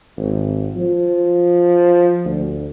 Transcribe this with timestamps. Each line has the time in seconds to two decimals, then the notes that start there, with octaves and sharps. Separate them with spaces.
0.17 G#1
0.76 F3
2.25 D2